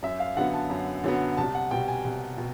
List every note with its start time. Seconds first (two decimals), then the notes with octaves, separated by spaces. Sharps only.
0.03 F#2 E5
0.20 F5
0.37 D3 F#3 B3 F#5
0.54 A5
0.70 F#2
1.04 D3 F#3 B3
1.37 C2 A5
1.55 F#5
1.71 B2 G3 G5
1.88 G#5
2.05 C2
2.38 B2